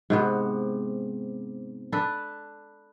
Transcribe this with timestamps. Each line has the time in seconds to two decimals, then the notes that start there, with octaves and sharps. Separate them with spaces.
0.10 G#2 C3 B3
1.92 D4 A4 B4